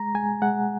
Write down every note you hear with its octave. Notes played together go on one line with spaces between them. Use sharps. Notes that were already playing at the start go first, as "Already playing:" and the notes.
Already playing: G#3 A#5
G#3 G#5
G#3 F#5